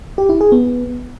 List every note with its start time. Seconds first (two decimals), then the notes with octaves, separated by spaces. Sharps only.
0.18 G4
0.29 E4
0.41 G#4
0.52 B3